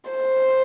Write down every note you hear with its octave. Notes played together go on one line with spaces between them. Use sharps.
C5